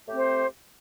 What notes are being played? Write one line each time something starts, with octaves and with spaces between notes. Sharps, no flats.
A3 C4 G4 C5